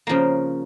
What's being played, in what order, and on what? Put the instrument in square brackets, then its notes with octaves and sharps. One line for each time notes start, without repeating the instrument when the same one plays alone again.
[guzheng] C#3 F3 A#3